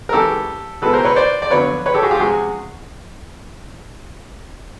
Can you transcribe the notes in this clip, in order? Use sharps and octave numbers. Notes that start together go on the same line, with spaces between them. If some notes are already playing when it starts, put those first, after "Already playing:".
A#4
C#2 C#3 E3 G#3 C#4 G4 A4
C#2 B2 G#3 B3 E4 A4 B4
A#4 C5
B4 C#5
C5 D5
D5
F2 D3 F#3 B3 B4 C#5
B4 C#5
G4 A4
F#4 G#4
F4 G4
C3 F3 G#3 C#4 F#4 G#4